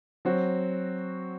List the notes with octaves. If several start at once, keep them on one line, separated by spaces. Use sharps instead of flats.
F#3 C4 F#4